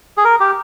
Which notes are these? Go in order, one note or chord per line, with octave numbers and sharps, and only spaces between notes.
G#4
A#4
G4